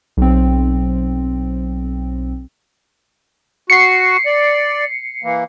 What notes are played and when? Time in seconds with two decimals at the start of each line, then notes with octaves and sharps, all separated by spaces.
0.17 B1 C4
3.70 F#4 C7 C#7
4.26 D5
5.23 E3 A#3